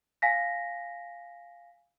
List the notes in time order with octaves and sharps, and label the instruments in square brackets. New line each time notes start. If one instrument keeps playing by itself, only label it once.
[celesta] F5 G#5 A#6 B6